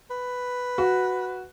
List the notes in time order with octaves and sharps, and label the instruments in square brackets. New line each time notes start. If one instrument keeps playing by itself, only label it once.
[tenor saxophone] B4
[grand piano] F#4